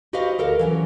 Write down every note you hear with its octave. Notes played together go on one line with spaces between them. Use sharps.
F#4 G4 B4 C5 D#5 F5
D2 A4 A#4 F5
E3 F#3 C#4